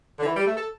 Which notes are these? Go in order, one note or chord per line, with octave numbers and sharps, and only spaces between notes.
D3
E3
G3
A3
A4